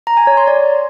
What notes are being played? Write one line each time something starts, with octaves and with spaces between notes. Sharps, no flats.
A#5
G#5
C#5
C6
D5